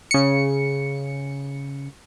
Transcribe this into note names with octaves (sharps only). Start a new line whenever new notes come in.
C#3 C#7